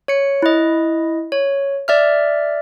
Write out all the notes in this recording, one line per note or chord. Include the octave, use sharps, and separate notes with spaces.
C#5 C#7
E4 D#5
C#5
D5 E5 F6